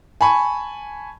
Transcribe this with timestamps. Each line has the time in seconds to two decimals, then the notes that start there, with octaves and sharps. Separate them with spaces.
0.21 G#5 A5 B5 C#6